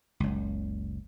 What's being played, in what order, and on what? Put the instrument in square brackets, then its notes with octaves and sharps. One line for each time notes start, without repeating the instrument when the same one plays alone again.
[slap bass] F#1 C#2